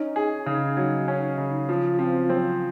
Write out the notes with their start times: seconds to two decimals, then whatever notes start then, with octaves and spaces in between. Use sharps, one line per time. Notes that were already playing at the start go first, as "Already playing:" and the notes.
Already playing: C#4 D#4
0.16 G#4
0.46 C#3
0.77 F#3
1.08 C#4
1.38 C#3
1.69 F3
1.99 F3 C4
2.29 F#3 C4